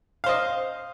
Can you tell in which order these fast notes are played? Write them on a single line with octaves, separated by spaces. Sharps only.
F5 C5 D#5